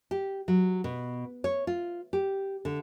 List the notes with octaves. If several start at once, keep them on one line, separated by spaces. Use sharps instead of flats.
G4
F#3
B2
C#5
F4
G4
D3